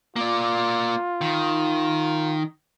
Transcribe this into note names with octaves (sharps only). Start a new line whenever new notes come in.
A#3 F4 D5
D#3